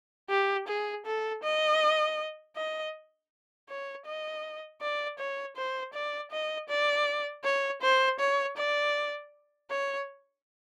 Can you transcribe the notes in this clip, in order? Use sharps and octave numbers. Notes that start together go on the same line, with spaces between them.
G4
G#4
A4
D#5
D#5
C#5
D#5
D5
C#5
C5
D5
D#5
D5
C#5
C5
C#5
D5
C#5